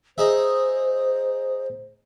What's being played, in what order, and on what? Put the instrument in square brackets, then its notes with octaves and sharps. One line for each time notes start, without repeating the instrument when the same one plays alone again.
[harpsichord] D#4 G#4 E5 [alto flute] C5